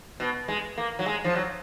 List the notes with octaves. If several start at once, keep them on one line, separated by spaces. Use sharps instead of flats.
B2
G#3
A#3
F#3
G#3
F3
F#3